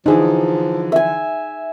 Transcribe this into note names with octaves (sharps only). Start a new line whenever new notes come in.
D3 E3 F3 D#4 G#4
E5 G#5